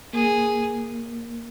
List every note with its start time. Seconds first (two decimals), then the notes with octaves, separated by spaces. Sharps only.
0.13 A#3 G#4